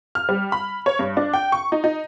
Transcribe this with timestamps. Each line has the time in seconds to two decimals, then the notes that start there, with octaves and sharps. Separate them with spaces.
0.15 F6
0.29 G3
0.52 B5
0.86 C#5
0.99 G2
1.17 D4
1.34 G5
1.52 C#6
1.72 D#4
1.84 D#4